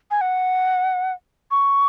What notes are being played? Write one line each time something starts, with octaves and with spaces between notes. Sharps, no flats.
G#5
F#5
C#6